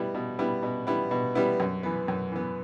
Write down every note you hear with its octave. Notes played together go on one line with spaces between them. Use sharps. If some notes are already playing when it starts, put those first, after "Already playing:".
Already playing: B2 G3 B3 E4
B2
G3 B3 E4
B2
G3 B3 E4
B2
G3 B3 E4
F#2
E3 B3
F#2
E3 B3